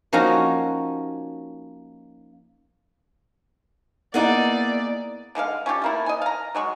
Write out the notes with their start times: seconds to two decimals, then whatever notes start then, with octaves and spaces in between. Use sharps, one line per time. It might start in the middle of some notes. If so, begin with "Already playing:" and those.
0.13 F3 A#3 C#4 D#4 F#4
4.14 A#3 B3 D#4 E4 G#4 D5 F#5
5.35 D3 G#3 B4 F5
5.66 C#4 F4 G4 A4
5.82 A3 A#3 E4
6.06 D#5 G#5
6.22 F5 A#5
6.55 F#3 G#3 C#6